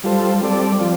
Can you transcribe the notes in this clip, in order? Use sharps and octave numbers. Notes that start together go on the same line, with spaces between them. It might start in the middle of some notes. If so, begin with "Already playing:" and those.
G3 F4 A4 C5
G3 C4 A4 D5
F3 C4 F4